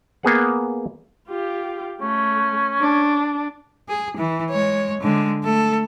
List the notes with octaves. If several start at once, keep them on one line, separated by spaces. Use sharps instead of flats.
A#3 B3 G#4 F#5
F4 G4
A3 C#4
D4
G#4
E3
G#3 C#5
D3 G#3
A3 A4